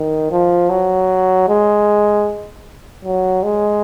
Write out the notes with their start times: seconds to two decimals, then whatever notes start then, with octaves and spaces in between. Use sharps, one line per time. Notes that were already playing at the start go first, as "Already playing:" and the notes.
Already playing: D#3
0.31 F3
0.69 F#3
1.48 G#3
3.05 F#3
3.43 G#3